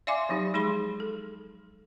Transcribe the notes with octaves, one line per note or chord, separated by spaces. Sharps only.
D5 E5 F5 G#5 C6 D6
F3 F#3 D#4 G4
G#3 D#4 G#4 B5 C6
A4